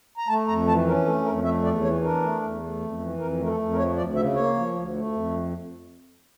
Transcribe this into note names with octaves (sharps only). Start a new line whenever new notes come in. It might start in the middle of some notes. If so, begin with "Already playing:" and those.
A#5
A3 A5
F2 A#5
E3 A5
C#4 A#4
A3 A4
F2 A#4
A3 E5
E2 D5
E3 C#5
D4 A#4
A3
E2
A3
F2
E3
F2 A#4
A3 A#4
A4
F2
A#4
F3 C#5
D2 D5
C#3 E5
A#3 C#5
F3
D2
A3
F2